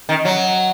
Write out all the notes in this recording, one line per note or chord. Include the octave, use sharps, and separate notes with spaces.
D#3
F#3